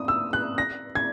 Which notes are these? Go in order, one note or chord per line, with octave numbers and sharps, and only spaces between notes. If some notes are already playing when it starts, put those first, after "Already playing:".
Already playing: D#6
E6
F#6
A#6
G#6